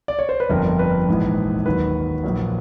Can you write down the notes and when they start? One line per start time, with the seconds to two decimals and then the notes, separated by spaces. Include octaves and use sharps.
0.08 D5
0.19 C#5
0.29 C5
0.40 B4
0.49 G1 F2 D3 A#4
0.79 B4
1.08 A#1 G#2 E3
1.66 D#2 D#3 F#3 B4
2.24 A#1 A#2 F#3